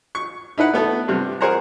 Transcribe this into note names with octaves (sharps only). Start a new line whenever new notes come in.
C#6
D#4 E4 B4 F#5
A3 B3 A4
G2 C3
G#4 A#4 C5 F#5 A#5